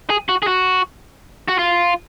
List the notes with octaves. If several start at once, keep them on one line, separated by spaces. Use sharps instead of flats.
G#4
F#4
G#4
F#4
F#4
F4